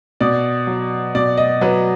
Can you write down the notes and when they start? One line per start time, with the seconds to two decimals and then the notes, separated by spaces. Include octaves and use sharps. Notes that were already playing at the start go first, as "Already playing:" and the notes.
0.21 B2 D5
0.67 F#3
1.15 B2 D5
1.37 D#5
1.61 F#3 B4